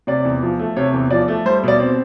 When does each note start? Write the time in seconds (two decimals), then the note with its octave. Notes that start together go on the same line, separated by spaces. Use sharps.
0.07 C3 D5
0.25 E2
0.43 F3
0.59 A3
0.76 C3 C#5
0.93 E2
1.10 F3 D5
1.28 A3
1.46 G3 C5
1.63 B2 D5
1.80 C4